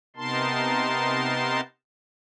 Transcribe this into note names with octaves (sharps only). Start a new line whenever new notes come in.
C3 B3 D#4 A#4 A5 C6